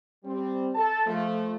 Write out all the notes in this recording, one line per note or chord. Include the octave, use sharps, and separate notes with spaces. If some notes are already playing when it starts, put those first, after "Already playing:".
G3 C4
A4 A5
F3 A3